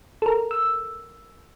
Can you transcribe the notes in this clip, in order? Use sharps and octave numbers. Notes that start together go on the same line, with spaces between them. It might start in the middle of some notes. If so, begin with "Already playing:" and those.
A4 A#4
E6